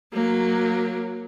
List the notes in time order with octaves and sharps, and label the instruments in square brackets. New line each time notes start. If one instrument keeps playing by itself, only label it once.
[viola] F#3 A#3